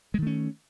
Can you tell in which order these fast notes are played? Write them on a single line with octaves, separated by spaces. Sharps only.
G#3 D#3 A3 C#4